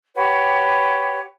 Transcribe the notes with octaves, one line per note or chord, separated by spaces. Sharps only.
F#4 G4 B4 C#5